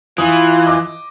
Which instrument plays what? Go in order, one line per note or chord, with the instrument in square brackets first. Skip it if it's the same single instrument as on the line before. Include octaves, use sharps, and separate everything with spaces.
[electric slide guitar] E3 [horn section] F4 [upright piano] D#6
[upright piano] D#5 D6